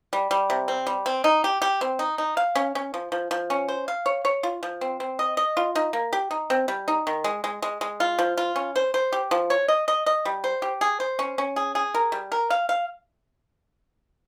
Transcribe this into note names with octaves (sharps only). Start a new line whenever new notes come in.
G3
G3
C3
C4
G3
C4
D#4
G4
G4
C4
D#4
D#4
F5
C#4
C#4
F3
F3
F3
C#4
C5
F5
C#5
C#5
F4
F3
C4
C4
D#5
D#5
F4
D#4
A#3
G4
D#4
C4
G3
D#4
D#3
G#3
G#3
G#3
G#3
F4
F3
F4
C#4
C5
C5
G4
F3
C#5
D#5
D#5
D#5
G3
C5
G4
G#4
C5
C#4
C#4
G#4
G#4
A#4
G3
A#4
F5
F5